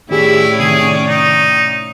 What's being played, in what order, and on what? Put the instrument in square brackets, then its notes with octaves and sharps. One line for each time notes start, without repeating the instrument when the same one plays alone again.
[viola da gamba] A2 C#4 D5 [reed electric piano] D#3 G4 G#4 [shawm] E4
[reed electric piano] C3 D#3 [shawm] G#4
[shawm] D#4